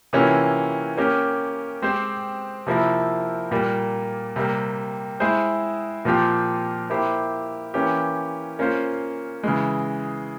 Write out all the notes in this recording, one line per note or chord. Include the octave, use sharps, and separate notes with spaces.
C3 E3 A#3 C#4 F4
A#3 C#4 G4 A#4
G#3 C4 G4 C5
C3 F3 A#3 E4 A#4
A#2 G3 A#3
C3 G3 A#3
G#3 E4 G#4 C5
A#2 F3 C4 G4
A#3 E4 G4 C5
E3 A#3 C#4 G4
A#3 C#4 F4 C5
C#3 E3 G#3